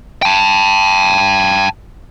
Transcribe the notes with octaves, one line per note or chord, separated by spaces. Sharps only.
G5 A5